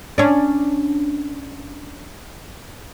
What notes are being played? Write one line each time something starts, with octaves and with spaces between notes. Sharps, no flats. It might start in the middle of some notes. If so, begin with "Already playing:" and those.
C#4 D4